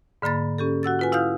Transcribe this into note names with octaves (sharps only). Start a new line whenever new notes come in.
G#2 D3 A#3 B5 A6
C#4 G4 A4
F#4 F#5 E6 A6
F4 B4 G#5
E4 F5 D#6 F6 G6